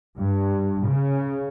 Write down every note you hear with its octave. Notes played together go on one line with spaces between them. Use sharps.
G2
C#3